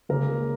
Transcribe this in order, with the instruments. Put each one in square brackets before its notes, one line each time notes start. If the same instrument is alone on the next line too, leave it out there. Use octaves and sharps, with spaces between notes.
[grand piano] C#2 C#3 A#3 C#4 A#4